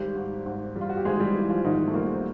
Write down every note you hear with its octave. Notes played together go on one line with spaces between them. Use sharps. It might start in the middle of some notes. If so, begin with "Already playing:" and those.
Already playing: G#1 G3 G4
G#2
G#2
G3
F4
F#4
G4
G#1 G#3 G#4
G3 G4
E3
F3 F4
G#2 D#3 D#4
A3
A#2 G3 A#3
C4